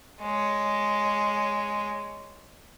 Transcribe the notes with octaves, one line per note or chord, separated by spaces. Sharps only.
G#3 C#5